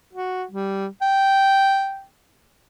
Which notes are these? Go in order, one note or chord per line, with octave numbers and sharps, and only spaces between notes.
F#4
G3
G5